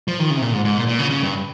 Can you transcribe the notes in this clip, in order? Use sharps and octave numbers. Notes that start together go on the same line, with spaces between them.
F3
D#3
C#3
C3
A#2
G#2
G#2
A#2
A#2
C#3
C#3
G2